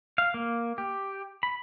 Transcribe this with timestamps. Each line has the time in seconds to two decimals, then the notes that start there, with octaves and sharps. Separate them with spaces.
0.18 F5
0.34 A#3
0.78 G4
1.43 B5